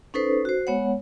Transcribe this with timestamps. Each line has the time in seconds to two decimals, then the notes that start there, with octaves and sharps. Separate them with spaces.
0.14 C#4 D#4 A4 B4 C5
0.45 F#4 C5
0.67 G#3 B3 C#5 F#5